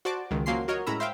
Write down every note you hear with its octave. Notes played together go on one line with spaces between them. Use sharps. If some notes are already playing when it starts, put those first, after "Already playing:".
F#4 C5 D5 A5 D6
C#2 D#3
F3 F#3 A#3 C#4 C6 C7
F#4 A#4 C#5 D#5
A2 G#3 C#4 A#5 B5 E6
C5 E5 F5 G5